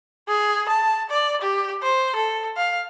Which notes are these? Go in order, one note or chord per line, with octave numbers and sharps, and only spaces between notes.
G#4
A5
D5
G4
C5
A4
F5